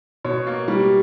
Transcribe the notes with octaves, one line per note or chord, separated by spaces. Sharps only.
B2 C#5
A#3
G3